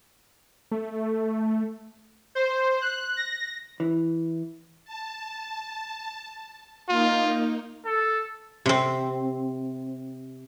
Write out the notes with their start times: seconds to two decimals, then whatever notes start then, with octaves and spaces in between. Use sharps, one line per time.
0.72 A3
2.35 C5
2.82 F#6
3.17 A#6
3.80 E3
4.85 A5
6.89 A#3 D#4 F4
7.86 A4
8.66 C3 C4